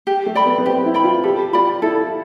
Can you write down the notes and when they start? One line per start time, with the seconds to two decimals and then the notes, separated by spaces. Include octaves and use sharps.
0.07 G4
0.26 A3
0.35 D5 G5 B5
0.46 B3
0.58 B3
0.65 C4 G4
0.85 E4
0.94 D5 G5 B5
1.04 F4
1.23 G4 A4
1.53 F4 D5 G5 B5
1.82 E4 A4